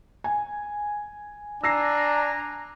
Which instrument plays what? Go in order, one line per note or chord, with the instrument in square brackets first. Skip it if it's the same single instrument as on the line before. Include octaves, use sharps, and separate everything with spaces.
[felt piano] G#5
[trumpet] D4 [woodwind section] G#5 A#5 [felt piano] E6 A#6 C7